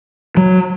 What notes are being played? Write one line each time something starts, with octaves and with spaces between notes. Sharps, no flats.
F#3